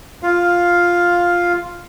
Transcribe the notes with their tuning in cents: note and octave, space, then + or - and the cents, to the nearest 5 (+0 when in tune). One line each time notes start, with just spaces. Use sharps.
F4 +0 F5 +5